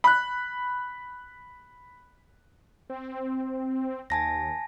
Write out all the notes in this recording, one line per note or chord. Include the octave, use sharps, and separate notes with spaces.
B5 F#6
C4
D#2 G#5 A5 A#6